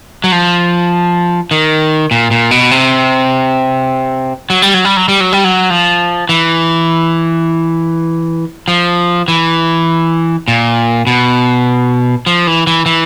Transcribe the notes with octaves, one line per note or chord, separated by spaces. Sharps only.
F#3
F3
D#3
A#2
A#2
B2
C3
F#3
G3
F#3
G3
F#3
G3
F#3
G3
F#3
F3
E3
F3
E3
A#2
B2
F3
E3
E3
E3